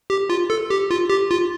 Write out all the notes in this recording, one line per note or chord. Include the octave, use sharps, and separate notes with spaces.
G4
F4
A4
G4
F4
G4
F4